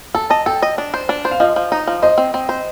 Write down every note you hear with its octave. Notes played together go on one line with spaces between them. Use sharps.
A4 A5
D#5 A5
A4 G5
D#5
D4
C5
D4
C5
F5
F3 D#5
F3
D#4
F3
C5 D#5
C4
C4
C5